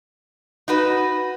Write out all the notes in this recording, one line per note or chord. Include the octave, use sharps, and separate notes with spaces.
D#4 F#4 B4